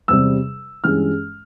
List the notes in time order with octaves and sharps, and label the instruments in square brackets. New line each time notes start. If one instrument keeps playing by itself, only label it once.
[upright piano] E2 C3 G3 E6
G2 E3 G#3 C#4 F6